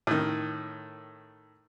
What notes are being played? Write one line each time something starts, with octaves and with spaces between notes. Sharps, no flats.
A2 D#3